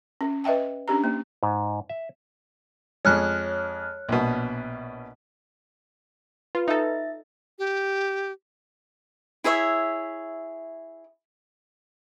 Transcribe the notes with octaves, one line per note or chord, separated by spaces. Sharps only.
C#4
B4 D#5 E5 G5 A5
C#4 D4 G4 A#5
A#3
G#2
E5
F2 G#3 C#5 F6 F#6
A#1 B2
F4 B4
D#4 A4 E5 A6
G4
E4 G#4 C#5 E5